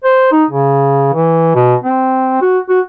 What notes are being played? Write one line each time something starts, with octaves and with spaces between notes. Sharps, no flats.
C5
D#4
C#3
E3
B2
C4
F#4
F#4